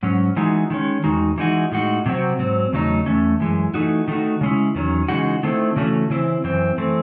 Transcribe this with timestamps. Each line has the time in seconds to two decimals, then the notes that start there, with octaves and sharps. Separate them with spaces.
0.03 G#2 F#3 C#4
0.36 E3 G#3 D#4 F#4
0.70 D#3 G#3 C#4
1.04 E2 D#3 G#3 D#4 F#4
1.38 E3 G#3 D#4 F#4
1.72 A2 G#3 D#4 F#4
2.06 C3 F#3 C4 F#4
2.39 G#2 F#3 C4
2.73 E2 C#3 F#3 A3 D#4
3.06 E2 D#3 A3 C#4
3.40 F#2 E3 G#3
3.74 E3 A3 D#4 F#4
4.08 D#3 A3 D#4 F#4
4.41 C#3 G#3 C#4 E4
4.75 E2 D#3 F#3 C#4
5.08 C#3 E3 G#3 D#4 F#4
5.43 D#3 A3 C4 E4
5.76 C#3 E3 A3 C#4 F#4
6.10 C#3 E3 C4 E4
6.44 F#2 E3 C4
6.78 E3 A3 C4